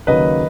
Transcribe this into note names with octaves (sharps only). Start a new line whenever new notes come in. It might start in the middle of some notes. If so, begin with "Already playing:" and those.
D#2 C#3 F#3 A#3 B4 D#5